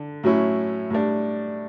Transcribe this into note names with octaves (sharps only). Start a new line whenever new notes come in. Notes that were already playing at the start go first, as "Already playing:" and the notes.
Already playing: D3
A2 F#3 C#4 E4
A2 G3 D4